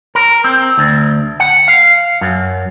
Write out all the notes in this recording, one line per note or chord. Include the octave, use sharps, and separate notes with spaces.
A#4
C4
D2
F#5
F5
F#2